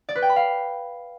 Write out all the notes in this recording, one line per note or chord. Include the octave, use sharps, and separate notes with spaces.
D5
B4
G5
B5
F5